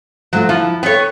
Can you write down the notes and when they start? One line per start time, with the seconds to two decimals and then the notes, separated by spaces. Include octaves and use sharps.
0.33 F3 F#3 A3 F4
0.49 F3 E4
0.83 B3 A4 C#5 G5